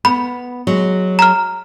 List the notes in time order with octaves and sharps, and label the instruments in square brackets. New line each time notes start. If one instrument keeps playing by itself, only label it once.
[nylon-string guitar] B3 [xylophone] B5
[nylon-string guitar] F#3 G#3
[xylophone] A#5 F6